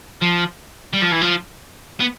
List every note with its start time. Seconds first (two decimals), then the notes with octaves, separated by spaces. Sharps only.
0.21 F3
0.94 G3
1.02 F3
1.12 E3
1.22 F3
2.00 B3